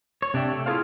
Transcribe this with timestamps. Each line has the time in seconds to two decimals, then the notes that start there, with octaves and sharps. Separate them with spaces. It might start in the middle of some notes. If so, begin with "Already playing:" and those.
0.22 C#5
0.34 C3 D4 D5 E5 G5
0.52 A3
0.66 E4 F4 G#4 A4 C5 F5